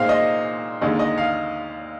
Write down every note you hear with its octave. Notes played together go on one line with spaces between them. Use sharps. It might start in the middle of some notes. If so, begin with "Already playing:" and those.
Already playing: A#2 G#3 C4 D#4 F5
D#5
D#2 D3 G#3 D#4 D#5
D#5
F5